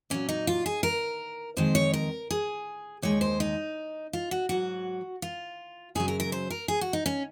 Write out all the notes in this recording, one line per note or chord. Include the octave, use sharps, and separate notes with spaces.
A#2 F#3 C#4
D#4
F4
G#4
A#4
F2 D#3 G#3 C5
C#5
A#4
G#4
D#2 D#3 G#3 C#5
C5
D#4
F4
F#4
G#2 F#3 F#4
F4
F#2 C#3 F#3 G#4
A#4
A#4
C5
A#4
G#4
F#4
D#4
C#4